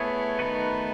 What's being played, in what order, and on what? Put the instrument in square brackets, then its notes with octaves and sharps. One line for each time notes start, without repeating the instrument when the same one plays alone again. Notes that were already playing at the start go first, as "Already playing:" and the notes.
Already playing: [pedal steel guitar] A3 E4 G#4 C#5 [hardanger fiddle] B3
[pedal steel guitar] D#3 A3 D#4 F#4 B4